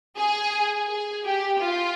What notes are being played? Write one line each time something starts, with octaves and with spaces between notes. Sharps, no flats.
G#4
G#4
G4
F4